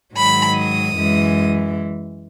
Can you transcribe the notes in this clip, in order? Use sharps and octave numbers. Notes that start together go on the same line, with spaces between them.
G#2 D#3 F#3 B5
D#6
F#2 E3 G#3